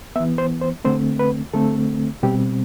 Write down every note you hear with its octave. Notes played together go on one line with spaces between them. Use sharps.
E3 B3 E5
C5
C5
D3 A3 C4 C5
B4
D3 A3 C4 A4
B2 G3 C4 G4